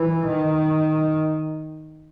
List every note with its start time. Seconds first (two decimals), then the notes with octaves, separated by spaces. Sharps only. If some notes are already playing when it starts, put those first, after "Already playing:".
Already playing: E3
0.27 D#3